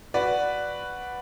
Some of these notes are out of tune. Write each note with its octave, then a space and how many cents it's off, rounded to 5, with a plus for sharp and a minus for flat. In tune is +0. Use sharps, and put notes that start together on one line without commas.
F#4 +0 B4 +0 D5 +0